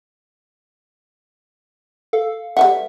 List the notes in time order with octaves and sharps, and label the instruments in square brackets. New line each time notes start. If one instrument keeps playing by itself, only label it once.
[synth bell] A4 F5
[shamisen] G3 B4 F#5 [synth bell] E5